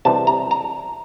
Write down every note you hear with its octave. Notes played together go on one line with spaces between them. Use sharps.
C3 E3 G3 A5
A#5
A#5